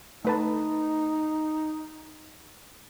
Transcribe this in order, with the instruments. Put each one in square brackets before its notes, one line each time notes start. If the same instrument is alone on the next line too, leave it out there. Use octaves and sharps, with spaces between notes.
[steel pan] A3 B4 A5 [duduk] D#4